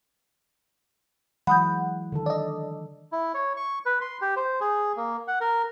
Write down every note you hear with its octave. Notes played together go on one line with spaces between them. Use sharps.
E3 F#3 G#3 F#5 B5 D#6 G6
D3 D#3 A4
D5 D#5
E4
C#5
C#6
B4
C6
G4
C5
G#4
A#3
F#5
A#4